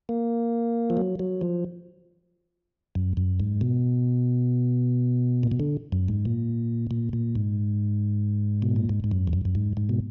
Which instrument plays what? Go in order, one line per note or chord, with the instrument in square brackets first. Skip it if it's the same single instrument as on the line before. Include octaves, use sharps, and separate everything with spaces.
[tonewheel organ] A#3
F3
F#3
F#3
F3
F#2
F#2
G#2
B2
A#2
B2
D3
F#2
G#2
A#2
A#2
A#2
G#2
B2
A#2
G#2
G#2
F#2
F2
F#2
F#2
G#2
G#2
B2